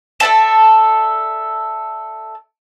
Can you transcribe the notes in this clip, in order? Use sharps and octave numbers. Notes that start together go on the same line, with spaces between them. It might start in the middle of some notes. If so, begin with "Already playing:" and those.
A4 D5 E5 A5